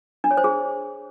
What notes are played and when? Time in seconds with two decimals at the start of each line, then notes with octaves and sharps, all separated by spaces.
0.24 D4
0.31 C#5
0.37 C5
0.44 G#4